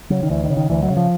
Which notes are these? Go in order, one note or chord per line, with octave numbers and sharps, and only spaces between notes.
C#3 F#3
D#3
D2 E3
D#3
C#3
D#3
D2 E3
F#3
C#3
F3